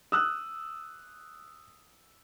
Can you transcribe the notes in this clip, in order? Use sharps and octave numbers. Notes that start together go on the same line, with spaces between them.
D#6 E6 F#6